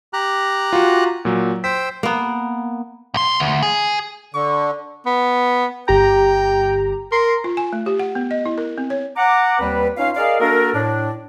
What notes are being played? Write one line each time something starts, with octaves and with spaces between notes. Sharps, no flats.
G4 A#5 F#6
F4 F#4
A#2 F#3
C5 G5 E6 B6
A#3 B3
B1 C6
D2
G#4
D3 C#6
B3
G1 G4 G5 A#5
A#4 C6
F4
G#5
A3
G4
F#5
B3
D#5
E4
A#4
C4
C#5
F#5 A#5 D6
D#2 G3 C4 B4
C#4 D#4 F4 C#5 F5
G#4 A#4 D5 D#5 F5
A#3 D4 F#4 A4 A#4
A2 D4